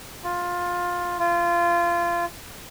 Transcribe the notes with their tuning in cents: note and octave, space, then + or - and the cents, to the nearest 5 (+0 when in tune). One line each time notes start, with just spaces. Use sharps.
F4 +15
F4 -20